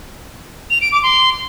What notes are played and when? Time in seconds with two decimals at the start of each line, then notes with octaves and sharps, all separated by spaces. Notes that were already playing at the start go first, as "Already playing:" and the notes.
0.70 F7
0.81 D7
0.92 D6
1.03 C6